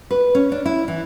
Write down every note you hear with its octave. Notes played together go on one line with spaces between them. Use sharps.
B4
C#4
D4
E4
E3